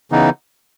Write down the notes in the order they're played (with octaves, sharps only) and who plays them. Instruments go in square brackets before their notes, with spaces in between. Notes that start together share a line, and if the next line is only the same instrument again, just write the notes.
[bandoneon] C#3 E3 B3 D#4